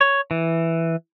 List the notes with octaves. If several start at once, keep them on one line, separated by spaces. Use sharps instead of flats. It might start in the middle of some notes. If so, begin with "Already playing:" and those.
C#5
E3